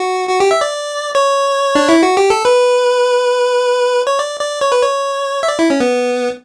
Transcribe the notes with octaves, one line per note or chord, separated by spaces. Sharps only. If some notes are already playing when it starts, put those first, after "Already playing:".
Already playing: F#4
F#4
G4
E5
D5
C#5
D4
E4
F#4
G4
A4
B4
C#5
D5
D5
C#5
B4
C#5
E5
D5
E4
C#4
B3